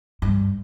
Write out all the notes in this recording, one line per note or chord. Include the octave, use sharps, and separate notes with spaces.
G2